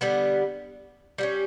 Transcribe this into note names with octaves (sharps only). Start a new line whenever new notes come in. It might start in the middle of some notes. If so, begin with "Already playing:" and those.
D3 G3 B3
G3 A#3 C#4